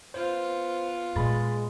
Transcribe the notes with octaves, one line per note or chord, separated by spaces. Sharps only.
B3 F4 C5
A#2 G#3 B5 A6